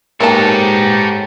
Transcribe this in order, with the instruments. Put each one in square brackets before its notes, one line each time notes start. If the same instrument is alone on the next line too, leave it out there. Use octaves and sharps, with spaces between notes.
[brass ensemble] G#2 G4 [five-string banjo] A#3 B3 A5 [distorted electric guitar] A4 C#5